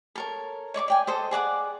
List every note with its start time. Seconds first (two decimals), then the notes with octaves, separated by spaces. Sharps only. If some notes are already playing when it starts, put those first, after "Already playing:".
0.15 A4 A#4 C#5
0.74 C#5 D5 C#6 D6
0.88 D5 G5 G#5
1.07 A4 C5 D#5
1.31 G#4 D5 F#5 D6